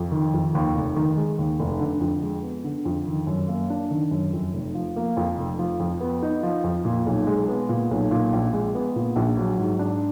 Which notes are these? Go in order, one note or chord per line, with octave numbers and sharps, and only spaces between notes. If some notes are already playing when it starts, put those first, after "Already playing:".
Already playing: F2
D#3
F2
D#2
F1
D#3
G#3
D#2
F1
D3
F2
G#3
B3
D3
F2
D#3
F#2
A#3
D4
D#3
F#2
F2
F1
F3
A#3
F2
F1
F3
F2
B3
D#4
F3
F2
A#2
B1
G#3
B3
A#2
B1
A#2
A#1
G#3
B3
A#2
A#1
F#3
G#2
D4